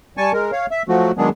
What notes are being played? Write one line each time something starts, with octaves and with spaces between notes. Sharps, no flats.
G3 G#5 A5 C#6
G#3 A#4
C#5 F5
E5
F3 F#3 A3 F#4
D#3 F#3 G#3 B3 D4 G#4